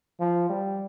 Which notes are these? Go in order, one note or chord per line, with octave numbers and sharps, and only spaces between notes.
F3
G3